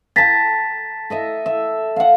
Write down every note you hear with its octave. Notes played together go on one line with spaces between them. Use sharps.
G5 A5 A#5 A6 B6
A4 D#5 E5
E5
F5 F#5